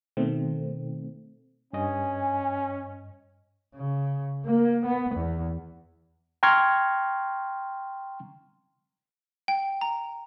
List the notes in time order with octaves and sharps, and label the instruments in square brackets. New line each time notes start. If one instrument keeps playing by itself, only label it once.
[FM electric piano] B2 D#3 A3 C4
[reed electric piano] G2 D#5 [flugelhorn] C#4 [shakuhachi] G#5
[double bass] C#3
A#3
B3
E2
[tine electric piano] G5 A#5 C6 C#6 F6 G#6
[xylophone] G5
A#5